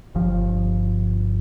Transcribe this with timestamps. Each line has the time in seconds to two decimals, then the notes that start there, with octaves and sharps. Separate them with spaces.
0.15 G1 G2 F3